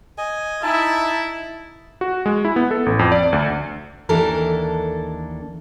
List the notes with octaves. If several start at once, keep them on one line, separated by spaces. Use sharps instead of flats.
D#5 G#5
D#4 E4 A5
F#4
G#3
E4
B3
A4
A1
F2
D5
D2
D#2 E3 D4 A4 A#4